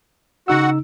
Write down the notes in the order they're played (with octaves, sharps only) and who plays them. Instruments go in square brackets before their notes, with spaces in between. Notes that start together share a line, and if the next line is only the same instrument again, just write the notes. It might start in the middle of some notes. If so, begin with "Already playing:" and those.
[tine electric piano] C#3 D#4 E6 [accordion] F#4 F#5